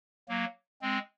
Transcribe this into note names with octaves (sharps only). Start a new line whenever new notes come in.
F#3 A#3
G#3 C4